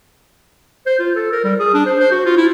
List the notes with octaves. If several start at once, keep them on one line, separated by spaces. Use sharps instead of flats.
C5
F4
A4
A#4
G3
G#4
D4
C5
C5
F#4
F4
E4